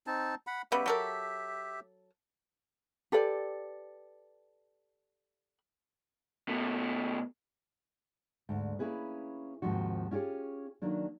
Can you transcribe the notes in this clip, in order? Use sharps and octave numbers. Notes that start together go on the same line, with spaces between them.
C4 D#4 A5
F#5 B5
C#3 G3 B3 G4 E5
F#3 A4 A#4
G4 A4 B4 D5
B2 A3
D2 G#2
A#3 C#4 E4 G#4 B4
D#2 G#2 C3 F3 F#4
C#4 F4 G4 G#4 C#5
D#3 F#3 A#3 D4